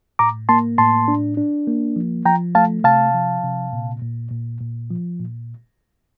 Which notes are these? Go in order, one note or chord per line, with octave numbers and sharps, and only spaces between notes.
A2 A#5 D6
A#3 A5 C6
A2 A5 C6
D4
D4
A#3
F3
F3 G5 A#5
A3 F5 A5
C3 F5 A5
F3
C3
A#2
A#2
A#2
A#2
F3
A#2